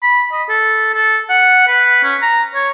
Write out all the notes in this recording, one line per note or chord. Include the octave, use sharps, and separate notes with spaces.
B5
D#5
A4
A4
F#5
B4
C#4
A#5
C#5